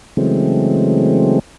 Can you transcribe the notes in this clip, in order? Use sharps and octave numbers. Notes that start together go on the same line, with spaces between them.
C#3 E3 F#3 G#3 A3 C4